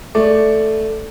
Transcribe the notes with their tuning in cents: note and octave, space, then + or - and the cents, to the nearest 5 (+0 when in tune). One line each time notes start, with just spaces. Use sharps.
A3 +0 D5 +0